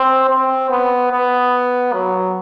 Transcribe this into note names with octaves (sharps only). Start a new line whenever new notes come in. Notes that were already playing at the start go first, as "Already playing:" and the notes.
Already playing: C4
C4
B3
B3
F#3